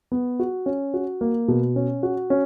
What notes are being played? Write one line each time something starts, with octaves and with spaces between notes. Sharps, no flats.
B3
F#4
C#4
F#4
A#3
B2
C#4
F#4
C#4